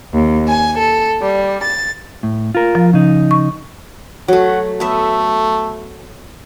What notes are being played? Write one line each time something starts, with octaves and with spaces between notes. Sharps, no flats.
D#2
G#5
A4
G3
A6
A2
F4 A#4
F3
C#3 D#4
C#6
F#3 A3 F#5
A3 B3 E5